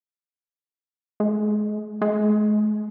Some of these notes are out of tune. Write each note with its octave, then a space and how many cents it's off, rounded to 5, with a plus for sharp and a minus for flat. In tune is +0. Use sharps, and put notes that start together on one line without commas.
G#3 +30
G#3 +35